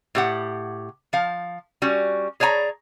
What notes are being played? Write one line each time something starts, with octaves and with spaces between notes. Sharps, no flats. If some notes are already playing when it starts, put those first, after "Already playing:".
A2 G4 F#5
F3 F5
G3 C#4 F#4
G#4 C#5 D5 G#5 A#5